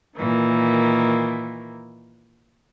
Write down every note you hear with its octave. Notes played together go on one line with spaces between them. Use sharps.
A#2 D#3 E3